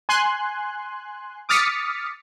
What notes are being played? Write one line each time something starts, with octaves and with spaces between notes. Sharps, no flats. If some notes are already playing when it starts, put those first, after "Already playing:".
G#5 C6 F#6
D6 D#6 F6 A6 B6 C#7